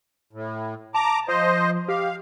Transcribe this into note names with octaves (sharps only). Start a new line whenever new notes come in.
A2
A5 A#5 D6
F3 C5 D#5
G4 F5